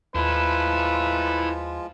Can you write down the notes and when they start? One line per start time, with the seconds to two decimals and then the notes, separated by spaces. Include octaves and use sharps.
0.15 D#2 F3 G#3 E4 F4 A4 B4